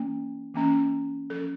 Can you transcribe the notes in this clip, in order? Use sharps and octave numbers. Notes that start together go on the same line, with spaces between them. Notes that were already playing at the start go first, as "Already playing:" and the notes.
Already playing: E3 A#3 C#4
E3 A#3 C#4
F3 C#4 A4